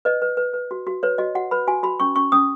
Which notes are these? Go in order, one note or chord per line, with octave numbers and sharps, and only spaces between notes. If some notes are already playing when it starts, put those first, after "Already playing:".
B4 D#5
B4
B4
B4
F#4
F#4
B4 C#5
F#4 D#5
F#4 F#5
B4 B5
F#4 G#5
F#4 B5
C#4 C#6
C#4 C#6
C#4 D#6